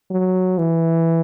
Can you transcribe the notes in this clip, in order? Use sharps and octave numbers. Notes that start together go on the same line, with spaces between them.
F#3
E3